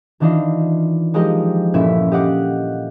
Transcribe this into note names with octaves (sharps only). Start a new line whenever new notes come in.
D#3 E3 D4 D#4 F4 D#5
F3 G#3 D#4 G4 A#4 D#5
G1 A#2 C#4 E4 E5
G4 D#5 F5 F#5 D6